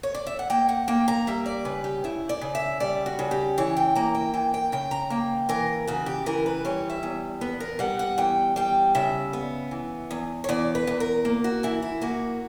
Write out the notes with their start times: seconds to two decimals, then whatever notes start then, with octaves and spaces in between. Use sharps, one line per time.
0.03 C#5
0.14 D5
0.27 E5
0.39 F#5
0.50 A#3 G5
0.69 F#5
0.88 A#3 G5
1.08 A#5
1.27 G3 E5
1.46 D5
1.65 C#3 B4
1.84 G4
2.04 C#3 E4
2.29 D5
2.41 C#3
2.55 E5
2.80 G3 D5
3.06 F#4
3.19 C#3
3.31 G4
3.58 E3 C#5
3.77 G5
3.95 A#3 A#5
4.15 G5
4.34 E3 G5
4.54 G5
4.72 C#3 G5
4.91 A#5
5.10 A#3 G5
5.49 E3 A#4
5.87 C#3 F#4
6.06 G4
6.26 E3 A#4
6.46 B4
6.65 G3 C#5
6.90 E5
7.03 E2
7.41 B3 B4
7.60 A#4
7.79 G3 F#5
7.99 F#5
8.18 E2 G5
8.56 G3 G5
8.95 C#3 E5
9.33 B3
9.71 E3
10.11 E2
10.44 C#5
10.49 E2 D5
10.75 B4
10.87 E2
11.00 A#4
11.25 A#3
11.44 F#4
11.63 E3 E4
11.82 E4
12.02 A#3 F#4